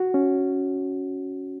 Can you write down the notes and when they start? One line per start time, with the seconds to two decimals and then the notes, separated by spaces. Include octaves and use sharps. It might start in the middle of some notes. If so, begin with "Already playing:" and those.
Already playing: F#4
0.14 C#4